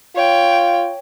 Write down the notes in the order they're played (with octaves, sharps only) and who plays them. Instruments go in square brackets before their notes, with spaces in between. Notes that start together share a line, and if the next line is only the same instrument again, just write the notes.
[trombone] F4 [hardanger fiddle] C#5 G5